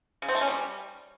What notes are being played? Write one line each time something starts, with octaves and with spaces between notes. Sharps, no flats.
C#3
C4
A3
C#4
G3